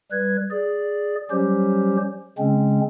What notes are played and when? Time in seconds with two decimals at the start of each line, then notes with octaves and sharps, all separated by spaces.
0.11 G3 B4 G#6
0.51 G#4 D5
1.31 F#3 G3 C#4 G4 C5
2.38 C#3 G#3 C4 C#4